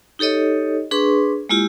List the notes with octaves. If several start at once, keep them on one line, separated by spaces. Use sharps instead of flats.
D#4 G4 A4 C#5 D#5
D4 G#4 B4 C6 C#6
G#3 A#3 E4 F4 G4